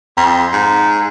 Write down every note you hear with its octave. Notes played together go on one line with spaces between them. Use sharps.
F2
G#2